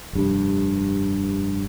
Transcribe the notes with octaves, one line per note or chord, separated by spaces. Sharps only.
F1 G2